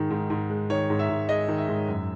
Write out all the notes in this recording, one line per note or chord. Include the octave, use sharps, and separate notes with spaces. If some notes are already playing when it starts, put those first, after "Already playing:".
Already playing: G#2 D#3 G#3
G#2
G#2
G#3
D#3 C#5
G#2
E5
G#2
G#3 D#5
D#3
E5
G#2
F#2